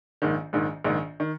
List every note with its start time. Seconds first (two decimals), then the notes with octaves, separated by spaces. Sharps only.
0.22 A#1 G#2 D#3
0.53 A#1 G#2 D#3
0.84 A#1 G#2 D#3
1.20 D#3